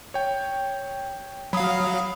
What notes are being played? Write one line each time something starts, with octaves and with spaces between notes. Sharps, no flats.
C#5 G5
F#3 F5 B5 D#6